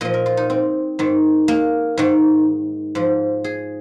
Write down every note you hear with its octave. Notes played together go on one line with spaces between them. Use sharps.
A#2 F3 D#5
A#4
F4
D#4
C4
G#2 D#3
A#3
G#2 D#3
G#2 F3
G#4